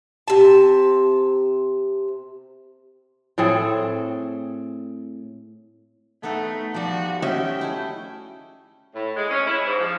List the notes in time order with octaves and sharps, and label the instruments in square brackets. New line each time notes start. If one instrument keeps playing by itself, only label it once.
[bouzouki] C3 A5
[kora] A2 C4 G#4 A4
[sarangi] A3 [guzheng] B3 D#4 A4
[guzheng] F3 G3 [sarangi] F#4
[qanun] C#4 E5 [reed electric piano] F#4 D#5 [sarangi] G5
[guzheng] A3 E4 G#4
[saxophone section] A2
G#3
C#4
E4
G#2
F3